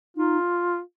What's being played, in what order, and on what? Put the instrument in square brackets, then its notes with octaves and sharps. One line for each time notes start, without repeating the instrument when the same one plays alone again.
[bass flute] D#4 [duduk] F4